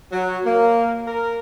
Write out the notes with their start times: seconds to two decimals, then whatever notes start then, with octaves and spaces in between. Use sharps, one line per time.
0.12 F#3
0.44 A#3
1.07 A#4